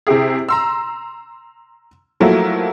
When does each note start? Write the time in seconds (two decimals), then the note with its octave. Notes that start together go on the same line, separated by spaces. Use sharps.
0.07 C3 E4 G4 G#4
0.49 A#5 C6 E6
2.20 F3 F#3 A3 A#3 E4